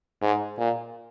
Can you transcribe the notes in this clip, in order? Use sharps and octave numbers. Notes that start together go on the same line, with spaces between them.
G#2
A#2